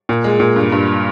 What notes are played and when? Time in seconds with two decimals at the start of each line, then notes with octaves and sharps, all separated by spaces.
0.09 A#2
0.24 G#3
0.40 A#2
0.56 G2
0.72 G2